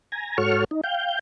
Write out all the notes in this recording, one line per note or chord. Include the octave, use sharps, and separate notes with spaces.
G#5 A#5
G#2 F#4 A4 C#5 C#6 F6
D#4
F5 G5 G6